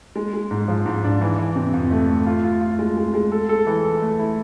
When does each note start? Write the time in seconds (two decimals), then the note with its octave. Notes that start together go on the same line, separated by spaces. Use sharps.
0.16 G#3
0.34 G#3
0.51 G#2
0.68 F3
0.86 G#2
1.04 D4
1.21 E3
1.38 E3
1.56 C3
1.74 F2
1.91 A3
2.09 A3
2.26 F4
2.44 F4
2.61 F4
2.79 G#3
2.97 G#3
3.14 G#3
3.32 A4
3.49 A4
3.67 E3
3.85 A4
4.02 A3
4.19 E4